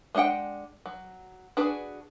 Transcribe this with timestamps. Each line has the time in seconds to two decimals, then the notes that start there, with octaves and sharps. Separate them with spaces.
0.15 G#3 D4 A4 F#5 G5
0.86 F#3
1.57 D4 F#4 G#4 B4